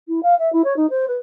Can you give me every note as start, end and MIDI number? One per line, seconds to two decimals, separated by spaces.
0.08 0.22 64
0.22 0.34 77
0.39 0.52 76
0.52 0.62 64
0.64 0.73 73
0.76 0.86 63
0.90 1.05 72
1.07 1.17 71